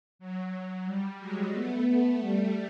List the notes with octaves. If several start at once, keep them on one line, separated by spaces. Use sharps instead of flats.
F#3
G3
F#3 G#3
A3 B3
G3 A3